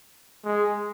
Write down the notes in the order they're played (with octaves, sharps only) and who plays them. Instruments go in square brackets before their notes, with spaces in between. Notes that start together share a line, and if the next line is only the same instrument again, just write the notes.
[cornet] G#3